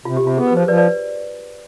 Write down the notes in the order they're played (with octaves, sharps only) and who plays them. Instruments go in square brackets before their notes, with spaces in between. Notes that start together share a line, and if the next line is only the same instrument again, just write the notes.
[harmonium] C3 [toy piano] F4
[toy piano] G4
[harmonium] C3
[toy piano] F4
[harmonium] B3 [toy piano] G#4
[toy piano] B4
[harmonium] F3 [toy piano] C5
[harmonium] F3 [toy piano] B4 D5
[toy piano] B4 D5